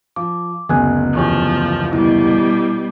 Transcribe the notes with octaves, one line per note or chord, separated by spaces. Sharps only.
F3 D6
F#1 D2 B3 G#4 G#5 F#6
E2 F3 C#4 G4
B2 G3 E4